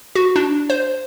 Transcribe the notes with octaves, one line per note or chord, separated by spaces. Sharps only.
F#4
D4
C5